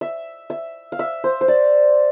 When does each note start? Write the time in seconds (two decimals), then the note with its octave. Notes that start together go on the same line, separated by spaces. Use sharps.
0.01 E5
0.50 E5
0.92 F5
0.99 E5
1.24 C5
1.41 C5
1.48 D5